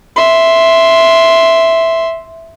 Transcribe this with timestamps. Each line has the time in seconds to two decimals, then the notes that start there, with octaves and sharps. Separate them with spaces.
0.16 E5 C6